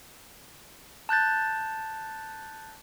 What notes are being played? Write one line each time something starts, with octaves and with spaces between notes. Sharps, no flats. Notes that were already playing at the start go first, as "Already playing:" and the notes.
A5 F#6 G6 A6